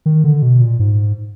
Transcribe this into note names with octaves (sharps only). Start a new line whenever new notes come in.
D#3
D3
B2
A#2
G#2